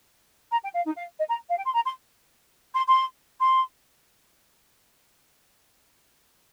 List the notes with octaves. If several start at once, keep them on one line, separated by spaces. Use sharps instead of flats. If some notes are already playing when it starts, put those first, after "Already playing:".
A#5
G5
F5
D#4
F5
D#5
A#5
F5
G5
C6
A#5
C6
C6
C6
C6